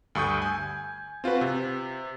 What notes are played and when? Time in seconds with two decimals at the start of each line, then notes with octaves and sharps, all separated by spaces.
0.15 D2 G2 C#6 D#6 G6
0.42 G#5
1.24 C4 F4 F#4 B4
1.41 C3